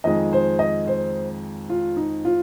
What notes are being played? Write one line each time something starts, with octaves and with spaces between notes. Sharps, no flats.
F2 D#3 G#3 D#5
C5
D#5
C5
F4
D#4
F4